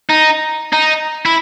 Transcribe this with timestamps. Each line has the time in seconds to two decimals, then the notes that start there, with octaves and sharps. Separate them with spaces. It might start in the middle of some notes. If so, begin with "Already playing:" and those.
0.09 D#4
0.73 D#4
1.26 E4